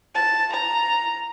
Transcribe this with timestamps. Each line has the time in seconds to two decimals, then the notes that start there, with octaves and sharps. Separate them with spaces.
0.15 A5
0.53 A#5